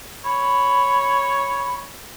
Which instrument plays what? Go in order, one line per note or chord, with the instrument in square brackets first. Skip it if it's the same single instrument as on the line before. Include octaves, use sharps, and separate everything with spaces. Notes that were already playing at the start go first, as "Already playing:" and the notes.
[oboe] C#5 [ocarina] B5